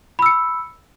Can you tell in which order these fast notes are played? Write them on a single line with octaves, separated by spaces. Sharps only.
B5 E6 C#7